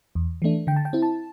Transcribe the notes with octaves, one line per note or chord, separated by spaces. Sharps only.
E2
E3 A3 D4
D3 G5
A5
G5
C4 E4
A5